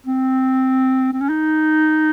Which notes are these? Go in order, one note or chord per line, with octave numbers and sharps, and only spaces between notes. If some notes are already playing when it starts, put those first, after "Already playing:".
C4
C4
C#4
D#4